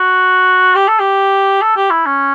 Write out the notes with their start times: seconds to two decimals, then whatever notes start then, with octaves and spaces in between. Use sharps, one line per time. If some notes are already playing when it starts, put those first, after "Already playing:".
Already playing: F#4
0.75 G4
0.88 A4
1.00 G4
1.62 A4
1.76 G4
1.90 E4
2.06 C#4